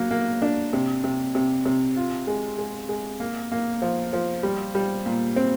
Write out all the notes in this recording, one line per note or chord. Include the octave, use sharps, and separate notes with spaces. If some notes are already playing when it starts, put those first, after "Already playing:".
Already playing: F#3 A#3
A#3
D4
C3
C3
C3
C3
F4
G#3
G#3
G#3
A#3
A#3
F3
F3
G3
G3
A#2
C4